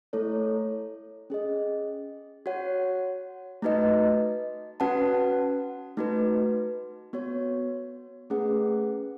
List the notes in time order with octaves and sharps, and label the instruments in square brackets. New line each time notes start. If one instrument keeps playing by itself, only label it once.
[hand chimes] A3 E4 A4 C#5
C#4 G#4 D#5
F#4 C#5 F#5
A3 D#4 F#4 B4 D#5
C#4 F#4 B4 F#5 A5
A3 D#4 F#4 B4
B3 F#4 C#5
A3 C#4 G#4 B4 F#5